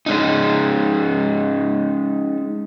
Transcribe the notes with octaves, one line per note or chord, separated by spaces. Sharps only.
G#3 C#4 D#4